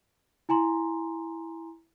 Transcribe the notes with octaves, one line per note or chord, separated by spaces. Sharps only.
E4 G#5 A#5 C6